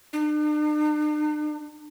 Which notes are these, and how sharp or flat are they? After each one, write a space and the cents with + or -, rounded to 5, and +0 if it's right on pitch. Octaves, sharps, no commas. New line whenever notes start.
D4 +45